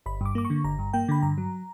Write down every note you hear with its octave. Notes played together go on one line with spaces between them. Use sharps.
G1 B5
G2 D6
A#3 D6
C#6
D3
G1 A#5
G2
A#3 G5
D3 B5
G2 A#5
F#3